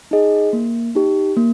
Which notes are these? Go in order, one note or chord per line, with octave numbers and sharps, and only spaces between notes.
D#4 G#4 D#5
A#3
D#4 G4
A#3